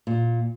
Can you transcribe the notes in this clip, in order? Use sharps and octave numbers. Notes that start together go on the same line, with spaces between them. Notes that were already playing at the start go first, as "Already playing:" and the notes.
A#2